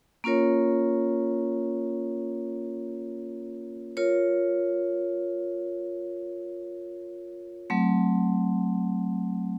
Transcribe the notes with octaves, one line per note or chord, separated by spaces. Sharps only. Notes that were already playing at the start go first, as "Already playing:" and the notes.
A#3 C#4 F4 A#4 C#5
F4 A#4 C#5
F#3 A3 C4